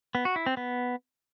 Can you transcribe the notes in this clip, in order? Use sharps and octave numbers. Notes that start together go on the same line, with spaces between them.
B3
F#4
E4
C4
B3